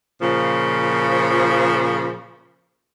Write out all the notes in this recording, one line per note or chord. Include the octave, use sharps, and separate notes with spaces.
A#2 C#3 F3